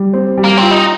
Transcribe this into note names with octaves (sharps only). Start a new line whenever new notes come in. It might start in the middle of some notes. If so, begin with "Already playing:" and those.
Already playing: G3
C4
G3
A#3
C4 F4
D#4